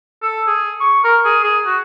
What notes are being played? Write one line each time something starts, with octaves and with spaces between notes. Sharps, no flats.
A4
G#4
C#6
A#4
G#4
G#4
F#4